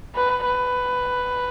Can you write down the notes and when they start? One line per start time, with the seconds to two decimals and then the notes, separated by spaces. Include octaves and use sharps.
0.15 B4
0.45 B4